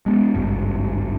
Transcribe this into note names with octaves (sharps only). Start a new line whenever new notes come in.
G#3 A#3 B3
G#1 C#2 G2